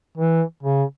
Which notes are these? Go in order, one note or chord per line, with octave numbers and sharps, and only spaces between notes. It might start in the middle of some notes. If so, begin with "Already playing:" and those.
E3
C#3